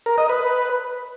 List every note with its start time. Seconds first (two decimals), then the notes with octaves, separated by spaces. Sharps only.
0.06 A#4
0.18 D#5
0.29 B4